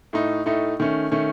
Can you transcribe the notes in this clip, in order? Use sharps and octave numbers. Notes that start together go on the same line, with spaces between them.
A2 A3 D#4
A2 A3 D#4
D#3 A3 C#4
D#3 A3 C#4